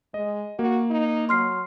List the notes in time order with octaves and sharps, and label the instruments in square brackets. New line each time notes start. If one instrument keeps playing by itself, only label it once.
[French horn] G#3 [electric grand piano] D#5
[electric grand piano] A#3 [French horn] F#4
[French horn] D#4
[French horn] F#3 [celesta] C6 F6 C7